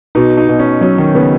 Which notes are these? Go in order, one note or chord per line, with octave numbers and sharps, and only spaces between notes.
B2 D#4
D#4
B2
C#4
F#3 C#4
D#3
C#3 B3